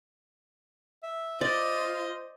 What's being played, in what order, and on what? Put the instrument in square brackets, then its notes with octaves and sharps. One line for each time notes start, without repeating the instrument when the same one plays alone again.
[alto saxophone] E5
[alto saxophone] F4 [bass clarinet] C5 [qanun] D5 [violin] D#5